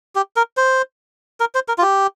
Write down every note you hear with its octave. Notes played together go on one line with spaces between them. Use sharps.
G4
A#4
C5
A#4
C5
A#4
F4
G4